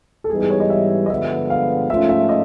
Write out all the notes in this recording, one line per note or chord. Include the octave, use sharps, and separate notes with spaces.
A4
G#2 E3 G3 B3 D#4 G#4
G#4
C#5
D#5
E5
D#5
G2 D3 F3 G#3 B3 E5
F5
G#2 F3 A3 C#4 F4 E5
E5
D#5